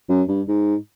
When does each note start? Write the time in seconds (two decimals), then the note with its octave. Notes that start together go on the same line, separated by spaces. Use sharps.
0.09 F#2
0.28 G2
0.48 G#2